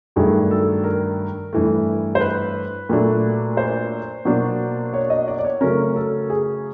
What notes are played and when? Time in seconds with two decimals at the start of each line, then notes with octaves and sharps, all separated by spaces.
0.16 G2 D#3 F#3 A3 D4 G#4
0.51 A4
0.84 A#4
1.53 G2 E3 A3
2.15 C5
2.21 B4
2.89 A#2 F#3 A3 D4
3.57 C5
4.25 B2 F#3 A#3 D4
4.93 C#5
5.10 D#5
5.28 D5
5.39 D5
5.45 C#5
5.61 C#3 F#3 A3 C#4 A#4
5.96 A4
6.30 G#4